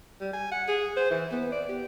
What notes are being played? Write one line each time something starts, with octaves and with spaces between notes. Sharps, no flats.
G3
G#5
F#5
G#4
C5
E3
B3
D5
G4